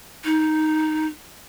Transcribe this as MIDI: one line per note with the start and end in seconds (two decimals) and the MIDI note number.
0.25 1.06 63